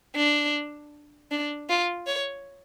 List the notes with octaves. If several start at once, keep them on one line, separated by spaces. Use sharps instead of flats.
D4
D4
F4
C#5